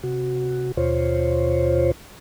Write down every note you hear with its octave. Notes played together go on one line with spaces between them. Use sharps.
C3 F#4
D#2 B2 F4 C5 C#5